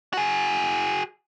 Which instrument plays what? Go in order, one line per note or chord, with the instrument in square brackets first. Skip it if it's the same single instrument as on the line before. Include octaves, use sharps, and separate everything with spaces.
[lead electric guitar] F#4 G#4